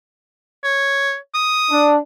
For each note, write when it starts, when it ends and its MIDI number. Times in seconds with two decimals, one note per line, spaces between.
0.64 1.16 73
1.34 1.92 87
1.71 1.97 62